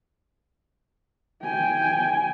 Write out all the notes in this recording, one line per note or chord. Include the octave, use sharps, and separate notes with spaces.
G5 G#5